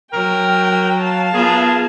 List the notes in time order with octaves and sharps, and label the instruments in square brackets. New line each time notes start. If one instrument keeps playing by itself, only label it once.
[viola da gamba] F#3 [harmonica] A#4 [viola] G5
[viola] F5 A5
[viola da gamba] B3 F4 A#4 [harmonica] G#4